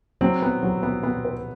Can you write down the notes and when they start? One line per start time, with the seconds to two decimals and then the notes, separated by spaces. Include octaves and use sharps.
0.21 F#3 C4
0.42 B3
0.63 F#3
0.83 B3
1.03 B3
1.25 B4